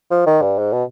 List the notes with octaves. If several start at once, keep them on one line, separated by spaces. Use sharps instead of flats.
F3
D#3
G2
G#2
B2